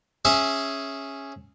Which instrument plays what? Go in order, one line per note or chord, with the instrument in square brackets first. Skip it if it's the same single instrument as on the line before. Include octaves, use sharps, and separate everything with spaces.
[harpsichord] C#4 G#4 E5